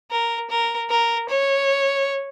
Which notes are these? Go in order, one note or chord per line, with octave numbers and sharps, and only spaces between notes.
A#4
A#4
A#4
C#5